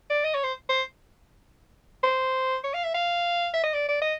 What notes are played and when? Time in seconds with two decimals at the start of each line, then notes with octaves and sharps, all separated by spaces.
0.10 D5
0.24 D#5
0.34 C#5
0.44 C5
0.69 C5
2.03 C5
2.64 C#5
2.74 F5
2.84 E5
2.94 F5
3.54 E5
3.64 D#5
3.74 D5
3.88 D5
4.02 D#5